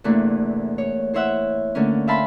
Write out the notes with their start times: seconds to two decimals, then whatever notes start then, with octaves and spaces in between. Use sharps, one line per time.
0.04 E2 C3 A3 A#3 D4 E4
0.78 C#5
1.14 E4 C5 C#5 E5 F#5 E6
1.75 D3 A3 A#3 C#4
2.08 E5 F5 G5 A5 B5 C6